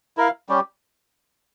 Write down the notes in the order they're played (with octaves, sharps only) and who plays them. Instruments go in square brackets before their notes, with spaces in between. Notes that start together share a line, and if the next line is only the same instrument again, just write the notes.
[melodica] E4 A#4 F5
G3 C#4 G4